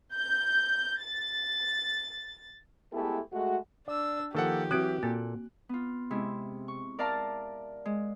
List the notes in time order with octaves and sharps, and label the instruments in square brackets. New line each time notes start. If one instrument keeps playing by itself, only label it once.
[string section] G6
A6
[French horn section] G#3 A3 B3 E4 G4 A4
G#3 A3 F#4
[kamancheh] D4 E6 [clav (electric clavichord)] D5
[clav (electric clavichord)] D#3 F3 [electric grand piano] A#3 A4 F#5 [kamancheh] G4
[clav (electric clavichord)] E3 F#3 [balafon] C4 F#4 [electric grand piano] F#6 D7
[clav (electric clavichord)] A#2 A4 [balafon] A#3
[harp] B3 F4
C3 G#3 E4
C#6
A#4 D5 E5 F5 A5 A#5
G#3